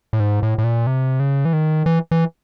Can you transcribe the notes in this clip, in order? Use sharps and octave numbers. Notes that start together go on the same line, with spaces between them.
A2
G#2
A2
A2
A#2
C3
C#3
E3
D#3
E3
E3